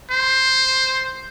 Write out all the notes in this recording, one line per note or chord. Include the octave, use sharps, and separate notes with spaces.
C5